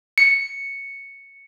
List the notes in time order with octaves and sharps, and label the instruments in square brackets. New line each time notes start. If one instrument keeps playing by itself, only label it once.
[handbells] C#7